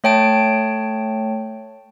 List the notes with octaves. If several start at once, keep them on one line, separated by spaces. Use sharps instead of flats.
A3 C#5 G5 A5 D7